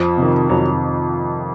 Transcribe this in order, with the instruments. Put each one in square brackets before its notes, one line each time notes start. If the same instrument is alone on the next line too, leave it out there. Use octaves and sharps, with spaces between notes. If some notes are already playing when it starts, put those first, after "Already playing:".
Already playing: [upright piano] F2 [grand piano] F3
[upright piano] C3
D#3
[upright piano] F2 [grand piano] F#3